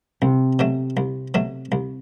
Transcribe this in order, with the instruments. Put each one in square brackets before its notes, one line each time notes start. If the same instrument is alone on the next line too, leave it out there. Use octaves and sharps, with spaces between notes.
[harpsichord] C2 [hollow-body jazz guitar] C3
[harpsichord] B2 F#3 A3
C2
B2 F#3 A3
C2